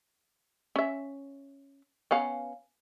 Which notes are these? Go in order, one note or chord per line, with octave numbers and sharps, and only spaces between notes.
C#4 E5
B3 C#4 F5